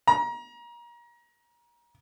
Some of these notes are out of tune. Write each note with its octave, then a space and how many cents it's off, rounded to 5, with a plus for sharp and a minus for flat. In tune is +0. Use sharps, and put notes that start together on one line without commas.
A#5 +30